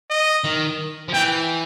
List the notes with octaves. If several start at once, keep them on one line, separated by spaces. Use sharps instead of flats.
D#5
D#3
F3
E3 G5